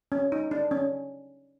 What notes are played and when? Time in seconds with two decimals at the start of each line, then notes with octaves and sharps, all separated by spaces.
0.12 C#4
0.32 D#4
0.51 D4
0.71 C#4